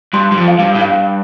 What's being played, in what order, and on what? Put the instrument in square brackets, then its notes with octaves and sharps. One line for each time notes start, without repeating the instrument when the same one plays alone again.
[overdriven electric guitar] G2 [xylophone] C6
[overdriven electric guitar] G2
F2
[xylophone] F5
[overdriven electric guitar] G2
A2
[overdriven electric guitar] G2 [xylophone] F5